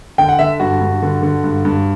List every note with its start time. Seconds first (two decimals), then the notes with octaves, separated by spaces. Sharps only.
0.18 D3 G5
0.29 F#5
0.39 D3 E5
0.60 G2 F#4
0.81 G2
1.02 D3
1.22 D3
1.44 G2
1.65 G2